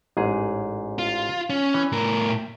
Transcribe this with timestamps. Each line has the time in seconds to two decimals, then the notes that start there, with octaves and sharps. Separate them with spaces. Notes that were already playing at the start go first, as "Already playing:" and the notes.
0.17 A1 G#2 G#4
0.99 F4
1.50 C#4
1.74 E3
1.92 A2 A#4
2.28 E5 G5